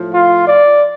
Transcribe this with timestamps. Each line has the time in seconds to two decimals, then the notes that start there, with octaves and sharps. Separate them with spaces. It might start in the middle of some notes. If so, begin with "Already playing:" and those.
Already playing: A2 F3
0.13 F4
0.48 D5